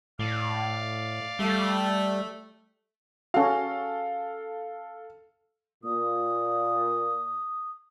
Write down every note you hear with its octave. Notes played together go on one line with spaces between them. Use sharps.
A2 D5 F5
G3 A3
C#4 F#4 A4 F5
A#2 D#6